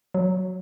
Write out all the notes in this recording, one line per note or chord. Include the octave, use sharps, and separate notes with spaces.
F#3